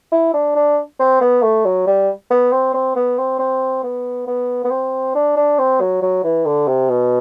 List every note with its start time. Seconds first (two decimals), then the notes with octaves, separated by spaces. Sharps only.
0.12 E4
0.34 D4
0.56 D4
0.99 C4
1.21 B3
1.43 A3
1.65 F#3
1.87 G3
2.31 B3
2.52 C4
2.74 C4
2.96 B3
3.19 C4
3.39 C4
3.84 B3
4.27 B3
4.64 B3
4.71 C4
5.15 D4
5.37 D4
5.59 C4
5.80 F#3
6.02 F#3
6.24 E3
6.46 D3
6.68 C3
6.90 B2